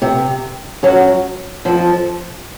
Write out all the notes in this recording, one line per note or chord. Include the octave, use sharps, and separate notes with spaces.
C3
F#2 F#3
F2 F3